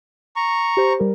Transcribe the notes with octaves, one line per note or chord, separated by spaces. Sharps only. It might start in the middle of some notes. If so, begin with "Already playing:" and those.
A#5 C#6
G4 C5
G3 A#4